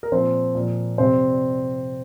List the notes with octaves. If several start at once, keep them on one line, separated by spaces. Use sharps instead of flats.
A#4
A#2 F3 C4 C5
A#2
F3
F2 C3 G3 C4 C5